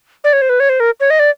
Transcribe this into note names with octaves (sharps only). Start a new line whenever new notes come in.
D5
C#5
C5
B4
C#5
C5
A#4
C#5
D#5
D5